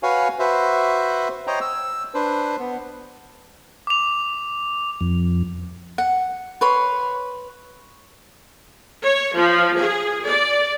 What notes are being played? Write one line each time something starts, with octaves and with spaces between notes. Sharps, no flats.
F#4 B4 C#5 F5 G#5
F#4 B4 C5 E5
C5 C#5 D#5 G5 A#5
E6
D4 B4 C5
B3
D6 F7
F2
F#5
B4 C#5 C6
C#5
F3
G#4
D5